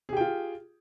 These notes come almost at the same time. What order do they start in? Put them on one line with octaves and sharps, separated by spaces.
G#4 G4 G5 F4